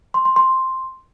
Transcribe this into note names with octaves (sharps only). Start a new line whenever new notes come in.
C6
C6
C6